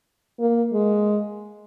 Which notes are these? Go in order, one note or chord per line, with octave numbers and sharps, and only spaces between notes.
A#3
G#3